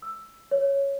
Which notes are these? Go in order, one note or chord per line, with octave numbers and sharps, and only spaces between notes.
E6
C#5